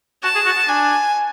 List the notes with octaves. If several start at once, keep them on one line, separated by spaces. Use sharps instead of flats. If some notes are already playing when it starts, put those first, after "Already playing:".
F#4 A5
G#4
F#4
F#4
D4 G#5